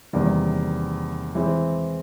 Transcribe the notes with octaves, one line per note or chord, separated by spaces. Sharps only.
E2 C3 D#3 G3 A#3
E3 G#3 C4